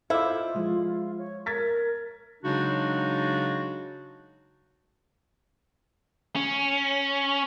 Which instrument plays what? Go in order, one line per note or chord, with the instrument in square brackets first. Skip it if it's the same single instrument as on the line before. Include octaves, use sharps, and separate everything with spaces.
[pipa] E4 [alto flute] F4 [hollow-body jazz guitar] A4 C5 D#5 [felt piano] F5 D6
[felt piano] F3 [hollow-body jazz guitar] G#3
[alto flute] C#5
[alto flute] A#4 [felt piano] G#6 A6 B6
[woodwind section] C#3 F#3 G#3 D4 D#4 F#4
[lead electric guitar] C#4